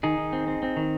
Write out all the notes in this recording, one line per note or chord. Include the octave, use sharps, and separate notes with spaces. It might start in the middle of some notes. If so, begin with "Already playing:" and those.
D#3 D#4 G#4
D#3
C4
C4
C4
D#3